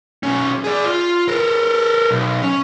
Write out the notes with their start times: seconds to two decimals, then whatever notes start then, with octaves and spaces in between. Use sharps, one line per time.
0.23 B1 C#4
0.64 G#4 D5
0.85 F4
1.28 A4 A#4
2.11 B1
2.42 C#4